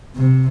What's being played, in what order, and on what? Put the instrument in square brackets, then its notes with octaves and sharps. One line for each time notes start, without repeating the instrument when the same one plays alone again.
[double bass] C3